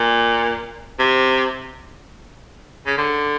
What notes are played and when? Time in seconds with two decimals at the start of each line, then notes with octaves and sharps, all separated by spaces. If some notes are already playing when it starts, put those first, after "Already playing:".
Already playing: A#2
0.99 C3
2.86 C#3
2.98 D3